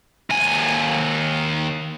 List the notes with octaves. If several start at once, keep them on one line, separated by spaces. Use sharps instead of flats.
D#2 G#5